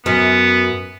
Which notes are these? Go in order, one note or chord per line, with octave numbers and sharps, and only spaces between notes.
F#2 B3